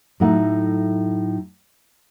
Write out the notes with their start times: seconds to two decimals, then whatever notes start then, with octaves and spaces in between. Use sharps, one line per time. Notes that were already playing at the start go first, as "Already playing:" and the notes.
0.20 A2 F#3 A3 D#4 F#5